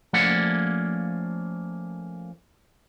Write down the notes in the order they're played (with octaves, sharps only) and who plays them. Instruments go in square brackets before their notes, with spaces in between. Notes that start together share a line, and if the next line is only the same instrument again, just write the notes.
[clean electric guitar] F3 A3 A#3 C#4 D5 F#5